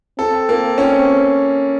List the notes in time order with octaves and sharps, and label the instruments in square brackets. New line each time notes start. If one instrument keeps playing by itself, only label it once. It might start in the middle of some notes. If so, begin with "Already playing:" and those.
[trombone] C4 [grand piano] A4
[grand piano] A#3
C#4